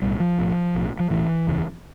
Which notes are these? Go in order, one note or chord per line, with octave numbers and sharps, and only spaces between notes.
B1 A2 G3
F3
B1 A2
B1 A2
F3
B1 A2 E3
F1 D#2 C#3